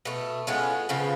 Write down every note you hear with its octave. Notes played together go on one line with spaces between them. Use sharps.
B2 A3
A2 G#3 B3 C#4 F4
C#3 F3 B3